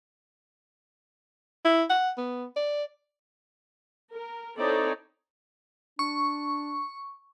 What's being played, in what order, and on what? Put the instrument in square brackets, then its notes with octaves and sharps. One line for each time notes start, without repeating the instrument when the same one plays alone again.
[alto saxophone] E4
F#5
B3
D5
[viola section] A#4
C4 D#4 E4 A4 C#5 D5
[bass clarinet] D4 [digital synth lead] C#6